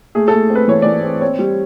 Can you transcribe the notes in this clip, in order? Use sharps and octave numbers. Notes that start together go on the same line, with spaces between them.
A3 G#4
A4
A3
C4
B4
E3 C#5
E3 D5
C4
C4 C#5
G3